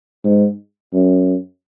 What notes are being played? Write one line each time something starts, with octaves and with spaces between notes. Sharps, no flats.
G#2
F#2